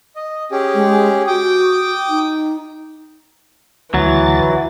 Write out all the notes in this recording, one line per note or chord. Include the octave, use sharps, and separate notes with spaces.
D#5
C#4 G4 G#4
G#3
F#4 G5 D6 D#6
D#4
D2 E3 F#3 A6